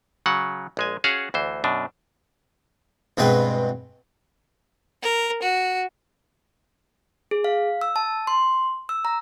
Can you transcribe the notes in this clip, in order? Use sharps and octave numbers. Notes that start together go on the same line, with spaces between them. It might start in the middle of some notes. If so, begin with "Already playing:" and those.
C#3 F#3 F#5
A#1 G#3 G#5
C#4 F#4 G#4 F5 F#5
D2 E3 C5
F#2 B2 D4
G2 B2 G#3 C4 B4
A#4
F#4
G#4
F5
E6
A5
C6
E6
A#5